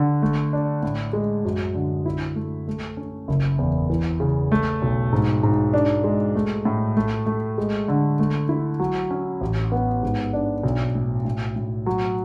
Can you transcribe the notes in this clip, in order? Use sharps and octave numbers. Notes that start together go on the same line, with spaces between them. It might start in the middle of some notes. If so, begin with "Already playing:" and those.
Already playing: D3
A3
D4
A2
G#3
F#2
D3
E4
A3
A3
C#4
F#1
E2
E3
C#3
A3
B1
G#2
G#2
D4
G#3
A3
A2
A3
A3
G#3
D3
A3
E4
F#3
C#4
A1
B3
G#2
D4
B1
A2
A2
A2
F#3